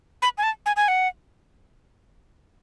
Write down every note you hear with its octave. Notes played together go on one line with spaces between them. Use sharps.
B5
G#5
A5
G#5
G#5
F#5